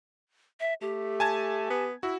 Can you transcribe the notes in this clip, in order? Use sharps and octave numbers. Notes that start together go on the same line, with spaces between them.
E5
A3 G4
G#5 A5 G#6
B3
E4 F#4